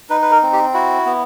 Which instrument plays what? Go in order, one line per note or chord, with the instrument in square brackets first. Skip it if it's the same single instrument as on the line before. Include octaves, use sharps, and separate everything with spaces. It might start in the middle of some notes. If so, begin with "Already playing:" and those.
[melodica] D#4 B4
B4
A#4
C4
G4
E4 F#4
B3